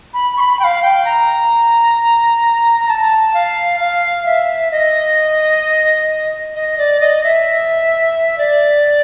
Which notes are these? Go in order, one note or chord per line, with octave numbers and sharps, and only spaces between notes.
B5
C#6
B5
G5
F5
G5
A#5
A#5
A5
F5
F5
E5
D#5
D#5
D5
D#5
E5
D5